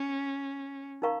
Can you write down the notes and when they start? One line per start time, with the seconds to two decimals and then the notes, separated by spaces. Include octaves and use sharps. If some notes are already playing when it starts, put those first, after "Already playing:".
Already playing: C#4
1.02 D#4 A#4 F5 A#5 C#6